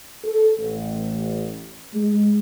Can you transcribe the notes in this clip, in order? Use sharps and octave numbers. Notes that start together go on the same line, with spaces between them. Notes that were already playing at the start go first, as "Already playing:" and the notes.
A4
A1
G#3